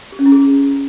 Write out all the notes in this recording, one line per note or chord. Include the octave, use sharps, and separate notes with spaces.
G4
C#4
E4
G#4